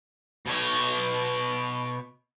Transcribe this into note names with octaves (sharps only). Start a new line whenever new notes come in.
B2 C#5